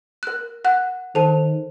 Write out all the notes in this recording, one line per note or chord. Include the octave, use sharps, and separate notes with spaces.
A#4 F#6
F#5 F#6
D#3 A4 C5 A5